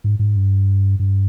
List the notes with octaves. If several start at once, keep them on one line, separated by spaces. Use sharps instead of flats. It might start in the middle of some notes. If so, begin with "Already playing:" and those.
G#2
G#2
G2
G2